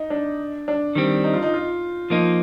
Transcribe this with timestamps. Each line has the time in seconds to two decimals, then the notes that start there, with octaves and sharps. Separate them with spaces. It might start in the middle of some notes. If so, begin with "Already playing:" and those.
Already playing: D#4
0.10 D4
0.68 D4
0.95 D#3 G3 C4
1.24 D#4
1.34 F4
1.43 D#4
1.54 F4
2.10 F3 A#3 D#4